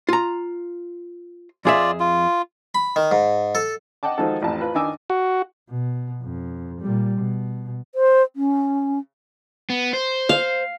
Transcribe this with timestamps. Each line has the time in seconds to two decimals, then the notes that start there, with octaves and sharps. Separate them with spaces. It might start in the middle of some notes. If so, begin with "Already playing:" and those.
0.09 F4 A#5
1.65 F2 F4 G#4 D5 E5
2.00 F4
2.75 B5
2.96 D#3
3.11 G#2
3.55 A4
4.03 D#5 F#5 G5 A5 D6
4.18 D#3 F3 G#3 F#4 A4
4.42 A1 F2 A5
4.61 F4 B4
4.75 D#3 D4 D#4 G#5 D6 E6
5.10 F#4
5.70 B2
6.23 F2
6.81 A#2 G3
7.19 B2
7.95 C5
8.36 C#4
9.70 B3
9.93 C5
10.29 F5